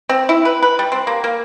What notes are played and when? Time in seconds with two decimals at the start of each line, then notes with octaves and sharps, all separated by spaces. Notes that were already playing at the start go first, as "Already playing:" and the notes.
0.09 C4
0.29 E4
0.45 B4
0.62 B4
0.79 G3
0.92 C4
1.07 A#3
1.24 A#3